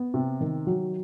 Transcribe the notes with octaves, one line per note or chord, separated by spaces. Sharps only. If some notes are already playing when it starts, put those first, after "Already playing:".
Already playing: B3
C3
D#3
F#3